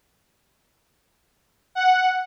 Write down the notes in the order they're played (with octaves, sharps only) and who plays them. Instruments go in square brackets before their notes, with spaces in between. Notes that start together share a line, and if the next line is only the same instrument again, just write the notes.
[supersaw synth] F#5